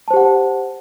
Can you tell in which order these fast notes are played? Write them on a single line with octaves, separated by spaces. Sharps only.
A5 C5 G4 F#5